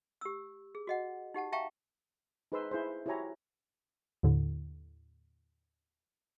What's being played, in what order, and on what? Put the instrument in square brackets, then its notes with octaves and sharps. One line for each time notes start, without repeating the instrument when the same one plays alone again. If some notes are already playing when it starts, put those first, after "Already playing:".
[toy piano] G4 E6
G#4
F#4 D#5 F#5
D#4 G4 F#5 A5
E5 F5 G5 A5 A#5 C#6
[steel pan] D#4 G#4 B4 C5 C6 E6
E4 G#4 C5
E4 F#4 G4 C#5 G#5 A#5
[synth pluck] D#2 A2 D3